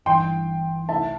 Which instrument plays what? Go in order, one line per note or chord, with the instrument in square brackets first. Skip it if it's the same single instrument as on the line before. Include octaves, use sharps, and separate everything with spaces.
[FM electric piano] G1 G2 E3 [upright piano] G5 C6
[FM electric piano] C2 C3 A3 E4 [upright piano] E5 A5